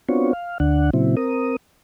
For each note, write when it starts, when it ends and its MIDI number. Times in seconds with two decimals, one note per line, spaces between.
0.09 0.33 59
0.09 0.33 60
0.09 0.33 62
0.09 0.33 65
0.09 0.33 66
0.09 0.33 73
0.33 0.58 77
0.60 0.90 38
0.60 0.90 50
0.60 0.90 62
0.60 0.90 78
0.93 1.16 46
0.93 1.16 49
0.93 1.16 54
0.93 1.16 60
0.93 1.16 64
1.17 1.56 60
1.17 1.56 70
1.17 1.56 87